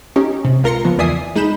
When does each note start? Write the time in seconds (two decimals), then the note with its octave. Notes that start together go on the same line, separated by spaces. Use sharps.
0.16 C#4 D#4 G4
0.45 C3
0.63 C#2 F4 A#4 C6 A#6 C#7
0.85 C#2 F3 B3
0.99 E2 D5 E5 G#5 D#6 C7
1.36 G#3 D#4 B5 G6 E7